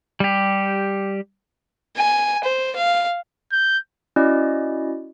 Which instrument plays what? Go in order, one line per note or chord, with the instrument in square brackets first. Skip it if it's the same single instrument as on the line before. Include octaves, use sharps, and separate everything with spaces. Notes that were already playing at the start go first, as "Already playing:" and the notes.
[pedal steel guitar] G3 G4
[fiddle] G#5
C5
F5
[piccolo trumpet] G6
[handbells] C#4 E4 F#4 D5 D#5